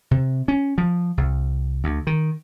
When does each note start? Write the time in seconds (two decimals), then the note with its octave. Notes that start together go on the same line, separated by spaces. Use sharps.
0.11 C3
0.48 C#4
0.78 F3
1.17 C2
1.84 D2
2.07 D#3